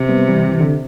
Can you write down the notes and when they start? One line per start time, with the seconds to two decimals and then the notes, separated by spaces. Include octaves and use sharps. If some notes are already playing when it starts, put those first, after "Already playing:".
Already playing: C3
0.09 G3 B3
0.28 E3 G3
0.48 E3
0.60 D3